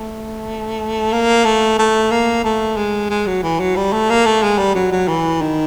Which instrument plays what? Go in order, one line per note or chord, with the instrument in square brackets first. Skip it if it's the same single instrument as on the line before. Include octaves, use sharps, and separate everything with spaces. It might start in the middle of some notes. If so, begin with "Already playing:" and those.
Already playing: [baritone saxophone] A3
A#3
A3
A3
A#3
A3
G#3
G#3
F#3
E3
F#3
G3
A3
A#3
A3
G#3
G3
F#3
F#3
E3
D#3